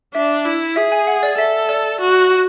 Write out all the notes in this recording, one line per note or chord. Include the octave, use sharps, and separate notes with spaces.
D4 E5
E4
G#4 E5
G#5
F#5
D5
A4 E5
D5
F#4